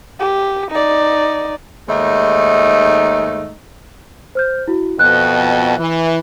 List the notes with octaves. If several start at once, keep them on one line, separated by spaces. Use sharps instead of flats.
G4
D#4 D5
D#2 G#2 A3 D#4
C5 F6 G6
E4 F#4
F2 B2 F#6
E3